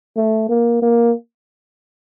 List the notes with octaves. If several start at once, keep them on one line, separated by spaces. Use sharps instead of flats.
A3
A#3
A#3